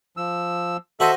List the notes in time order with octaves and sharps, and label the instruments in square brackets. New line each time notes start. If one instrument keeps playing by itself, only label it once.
[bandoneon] F3 E6
[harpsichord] F#4 C5 D#5 [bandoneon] A4 E5